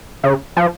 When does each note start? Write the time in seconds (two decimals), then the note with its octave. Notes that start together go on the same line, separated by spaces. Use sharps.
0.23 C#3
0.57 F3